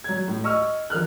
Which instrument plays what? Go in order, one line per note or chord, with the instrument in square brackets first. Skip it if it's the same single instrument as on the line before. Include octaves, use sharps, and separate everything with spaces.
[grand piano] F#3 G#6
A2
D#5 C#6 E6 F6
F3 A#4 F6 F#6